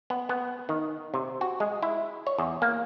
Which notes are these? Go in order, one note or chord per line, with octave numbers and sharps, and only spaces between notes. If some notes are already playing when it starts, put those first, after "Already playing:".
B3
B3
D#3
C3
F#4
G#3
E4
C#5
E2
A#3